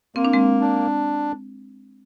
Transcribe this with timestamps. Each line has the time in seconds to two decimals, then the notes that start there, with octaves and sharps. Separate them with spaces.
0.15 A#3 C4
0.25 D4
0.33 G#3 C4
0.61 D4